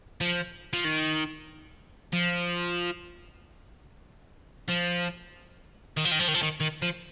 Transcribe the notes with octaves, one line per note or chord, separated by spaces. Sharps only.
F3
F3
D#3
F3
F3
D#3
F3
D#3
F3
D#3
F3
D#3
D#3
F3